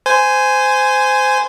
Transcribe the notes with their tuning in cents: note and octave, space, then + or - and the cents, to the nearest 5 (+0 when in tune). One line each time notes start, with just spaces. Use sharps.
C5 -20 G#5 +0